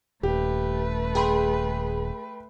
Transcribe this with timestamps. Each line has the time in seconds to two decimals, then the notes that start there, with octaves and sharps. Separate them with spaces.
0.23 D#1 A3 G4 B4
1.15 G#4 G5 B5 C6